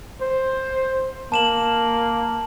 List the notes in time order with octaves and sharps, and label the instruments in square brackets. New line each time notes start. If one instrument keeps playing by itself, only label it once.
[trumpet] C5
[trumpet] A#3 [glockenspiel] A5 E7 F#7